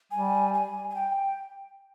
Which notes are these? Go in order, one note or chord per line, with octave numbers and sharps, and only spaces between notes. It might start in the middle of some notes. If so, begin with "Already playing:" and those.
G3 G#5
G#5
G#5
G5